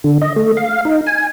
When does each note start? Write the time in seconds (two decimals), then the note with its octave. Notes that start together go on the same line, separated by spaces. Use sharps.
0.04 D3
0.21 D#5
0.36 A3
0.57 F5
0.85 D#4
1.07 G#5